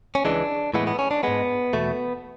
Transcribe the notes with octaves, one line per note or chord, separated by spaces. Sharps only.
C#4
C#2 C#3 E3 G#3 D4
A2 E3 G#3 B3
B3
C#4
D4
G#2 G#3 B3
E2 B2 A3